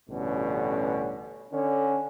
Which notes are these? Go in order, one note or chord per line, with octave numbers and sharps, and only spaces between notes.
A1 G2 B2 D3 C#4
D3 C#4